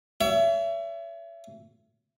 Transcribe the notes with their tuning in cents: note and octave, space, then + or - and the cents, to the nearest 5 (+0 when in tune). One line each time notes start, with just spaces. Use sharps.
C#5 +35 E5 +25